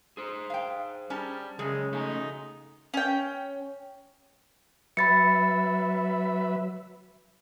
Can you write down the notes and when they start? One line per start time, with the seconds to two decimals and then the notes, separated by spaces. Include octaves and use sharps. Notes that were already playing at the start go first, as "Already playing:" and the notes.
0.17 G#4 C5
0.50 F5 G5
1.10 G3 C#4 A5 A#5
1.59 F#2 C#3 G#3 C#4 G#4
1.93 B2 A3 D#4 G#5
2.94 C#4 G5
4.97 F#3 B4 E5 B5 A6 C#7